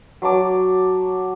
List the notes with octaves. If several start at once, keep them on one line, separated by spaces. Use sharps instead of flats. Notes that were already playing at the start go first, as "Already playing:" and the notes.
F#3 C#5 A5 D6